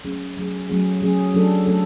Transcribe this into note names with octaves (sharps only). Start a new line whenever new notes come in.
F#3 A3 C#4 G#4
F#3 A3 C#4 G#4
F#3 A3 C#4 G#4
F#3 A3 C#4 G#4
F#3 A3 D4 A4
F#3 A3 D4 A4